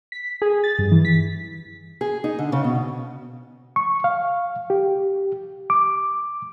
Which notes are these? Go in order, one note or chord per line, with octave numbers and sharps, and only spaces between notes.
B6
G#4
A6
G2
E3
B6
G#4
D#4
D3
C#3
B2
C#6
F5
G4
D6